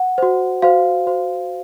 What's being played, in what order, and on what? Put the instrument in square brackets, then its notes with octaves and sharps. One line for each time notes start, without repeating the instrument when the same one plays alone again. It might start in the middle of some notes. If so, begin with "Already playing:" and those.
Already playing: [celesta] F#5
F#4 C5
F#4 C5 F5
F#4 C5